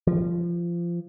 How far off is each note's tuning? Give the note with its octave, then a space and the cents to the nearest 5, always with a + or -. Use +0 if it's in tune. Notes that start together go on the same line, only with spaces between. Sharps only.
F3 -20